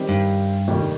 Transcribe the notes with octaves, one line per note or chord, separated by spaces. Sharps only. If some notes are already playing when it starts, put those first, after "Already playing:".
Already playing: D#3 G3 C4 G4 C5
G2
F1 D#2 D#3 G3 A#3